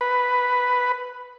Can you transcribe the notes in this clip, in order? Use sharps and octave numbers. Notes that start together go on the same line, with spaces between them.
B4